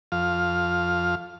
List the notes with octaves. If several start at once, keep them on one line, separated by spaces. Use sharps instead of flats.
F2 F5